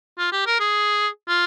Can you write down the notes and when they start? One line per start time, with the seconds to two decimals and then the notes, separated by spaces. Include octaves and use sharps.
0.18 F4
0.32 G4
0.46 A#4
0.60 G#4
1.28 F4